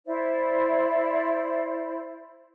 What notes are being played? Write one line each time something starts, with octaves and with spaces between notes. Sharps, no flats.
E4 C5 D5